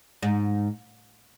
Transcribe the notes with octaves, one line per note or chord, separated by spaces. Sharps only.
G#2